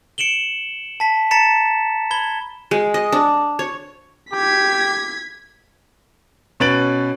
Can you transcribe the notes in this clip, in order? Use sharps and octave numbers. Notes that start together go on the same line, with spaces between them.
C#7 D7 E7 F#7 G7
A5 B6
A5 A#5 A6 B6 C#7 E7
B5 G#6 G7
G#3
D#5
D4
C#5
G4 G#6 B6
B2 C#4 B4 A6 D7 F#7